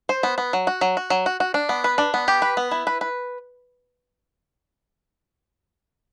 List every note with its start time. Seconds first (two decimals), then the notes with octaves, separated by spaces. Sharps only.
0.09 C5
0.23 B3
0.38 B3
0.53 F#3
0.67 F#4
0.81 F#3
0.97 F#4
1.10 F#3
1.26 F#4
1.40 F#4
1.54 D4
1.69 B3
1.84 B4
1.98 D4
2.14 B3
2.28 G4
2.42 B4
2.57 B3
2.71 E4
2.87 B4
3.01 B4